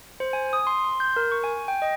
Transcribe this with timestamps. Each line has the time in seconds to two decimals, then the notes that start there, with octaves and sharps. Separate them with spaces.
0.20 C5
0.33 G#5
0.53 D#6
0.67 C6
0.85 C6
1.00 G6
1.16 A#4
1.32 C#6
1.44 G#5
1.68 G5
1.82 D#5